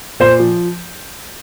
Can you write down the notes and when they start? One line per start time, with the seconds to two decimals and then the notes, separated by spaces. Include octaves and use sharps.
0.20 A#2 C5
0.39 F3